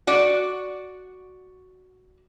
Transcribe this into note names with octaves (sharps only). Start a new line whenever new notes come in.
F#4 D5